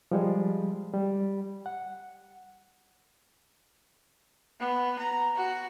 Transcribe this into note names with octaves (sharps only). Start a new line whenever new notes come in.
F3 G3 G#3
G3
F#5
B3
A#5
F#4